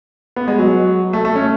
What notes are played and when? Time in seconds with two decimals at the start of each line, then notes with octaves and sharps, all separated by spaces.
0.36 B3
0.48 G#3
0.58 F#3
1.13 A3
1.25 A3
1.35 C#4